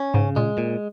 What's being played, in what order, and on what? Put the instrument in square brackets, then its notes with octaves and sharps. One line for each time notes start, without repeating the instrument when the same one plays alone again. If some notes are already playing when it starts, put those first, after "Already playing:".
Already playing: [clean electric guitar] C#4
[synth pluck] G#2 [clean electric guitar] C#3
[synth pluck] A#2 [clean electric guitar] G#3
[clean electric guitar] A#2